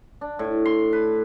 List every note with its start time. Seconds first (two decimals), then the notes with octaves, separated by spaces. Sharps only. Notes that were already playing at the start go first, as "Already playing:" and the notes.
0.21 D4
0.39 A2
0.65 C6
0.93 B4